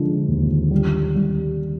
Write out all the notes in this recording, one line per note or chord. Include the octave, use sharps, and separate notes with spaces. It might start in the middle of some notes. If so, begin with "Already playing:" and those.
Already playing: D3 F3 G#3
D#2
G3
G3